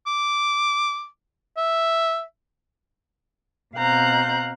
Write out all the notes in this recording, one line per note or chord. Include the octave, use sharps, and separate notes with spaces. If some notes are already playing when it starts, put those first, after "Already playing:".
D6
E5
B2 C4 F5 A#5 F#6 G6